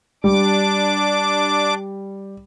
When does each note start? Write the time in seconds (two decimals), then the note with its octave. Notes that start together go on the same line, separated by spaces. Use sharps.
0.24 G3 D4 D6